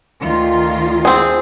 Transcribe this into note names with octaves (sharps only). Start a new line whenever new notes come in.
D2 D#3 F4
C4 G#4